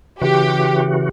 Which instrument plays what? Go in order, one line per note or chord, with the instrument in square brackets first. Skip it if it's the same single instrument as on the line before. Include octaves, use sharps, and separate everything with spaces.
[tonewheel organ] C#3 E3 F#4 [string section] G4